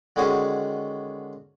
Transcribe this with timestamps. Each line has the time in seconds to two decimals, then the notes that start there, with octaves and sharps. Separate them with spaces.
0.16 D3 D#3 G#3 C#4 F#4 G#4